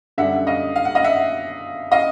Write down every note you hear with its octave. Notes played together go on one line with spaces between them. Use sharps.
F#2 D3 G3 E5 F#5
D#5 F5
F5
F#5
D#5 F5
E5 F#5
D#5 F5